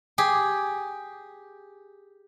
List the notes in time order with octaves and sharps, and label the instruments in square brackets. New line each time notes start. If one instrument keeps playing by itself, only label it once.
[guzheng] G4 G#4